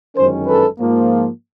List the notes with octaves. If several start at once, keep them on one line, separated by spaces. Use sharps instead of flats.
G1 F#2 D#3 G#3 C#4 A#4 C5
A4 B4
G#2 F3 A#3